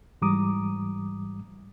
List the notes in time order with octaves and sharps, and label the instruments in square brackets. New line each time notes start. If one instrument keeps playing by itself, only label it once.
[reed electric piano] G#2 E3 G3 A#5 D6 D#6